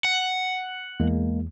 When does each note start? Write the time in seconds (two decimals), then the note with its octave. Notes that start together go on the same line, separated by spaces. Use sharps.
0.05 F#5
1.00 E2 G#3 A#3